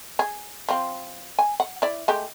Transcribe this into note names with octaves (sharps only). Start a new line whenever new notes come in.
G#4
F3 C4
G#5
F#5
E4 D5
G#3 A3 G4